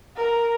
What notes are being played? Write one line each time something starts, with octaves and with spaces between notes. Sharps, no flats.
A#4